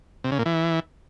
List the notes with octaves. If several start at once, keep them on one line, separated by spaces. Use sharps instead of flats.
C3
C#3
A#2
E3